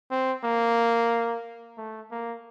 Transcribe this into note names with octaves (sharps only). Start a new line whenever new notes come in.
C4
A#3
A3
A#3